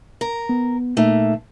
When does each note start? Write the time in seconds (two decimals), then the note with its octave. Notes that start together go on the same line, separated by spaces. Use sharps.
0.21 A#4
0.49 B3
0.97 A#2 A3 A#3 D#4 E5